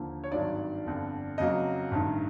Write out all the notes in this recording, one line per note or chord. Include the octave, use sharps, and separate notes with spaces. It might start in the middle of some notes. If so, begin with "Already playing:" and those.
Already playing: D#2 D3 F3 A#3
C#5
G#1 G2 D#3 F#3 D5
G1 F2 D3
F2 C#3 F#3 A#3 D#5
A1 G2 D#3